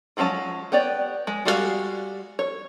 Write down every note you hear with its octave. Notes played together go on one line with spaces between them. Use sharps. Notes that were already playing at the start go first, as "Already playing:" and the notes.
F3 F#3 G#3 C#4 A5
B3 G4 C#5 D5
G#3
G3 G#3 F#4 A4 F5
C#5